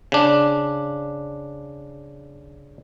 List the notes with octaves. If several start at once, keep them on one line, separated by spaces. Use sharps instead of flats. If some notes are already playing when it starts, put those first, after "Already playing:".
C#3 D4